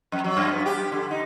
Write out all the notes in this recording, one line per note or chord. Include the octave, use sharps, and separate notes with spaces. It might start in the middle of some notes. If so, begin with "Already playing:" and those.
F2
F#3
F#2
B3
G4
D3
D#4